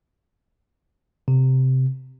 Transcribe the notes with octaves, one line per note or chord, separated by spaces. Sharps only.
C3